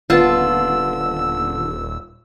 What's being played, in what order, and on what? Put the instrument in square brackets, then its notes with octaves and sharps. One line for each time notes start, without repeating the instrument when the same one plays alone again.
[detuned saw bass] D#1 [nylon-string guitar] D3 B3 [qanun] F4 A5 [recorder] E6